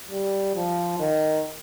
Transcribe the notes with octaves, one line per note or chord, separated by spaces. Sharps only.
G3
F3
D#3